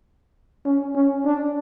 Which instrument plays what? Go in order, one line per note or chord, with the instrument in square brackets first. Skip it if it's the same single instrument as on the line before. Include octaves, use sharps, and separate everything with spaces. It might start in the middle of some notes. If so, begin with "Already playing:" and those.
[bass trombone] C#4
C#4
D4